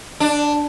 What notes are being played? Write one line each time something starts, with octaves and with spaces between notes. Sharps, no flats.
D4